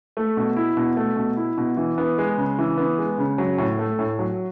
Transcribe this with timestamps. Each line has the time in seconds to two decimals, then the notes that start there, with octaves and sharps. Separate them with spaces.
0.17 A3
0.37 B2
0.56 E4
0.77 B2
0.97 A3
1.17 B2
1.37 E4
1.58 B2
1.77 E3
1.98 B3
2.18 G#3
2.37 C#3
2.59 E3
2.78 B3
2.98 G#3
3.18 C#3
3.38 F#3
3.58 A2
3.79 A3
3.99 A2
4.19 F#3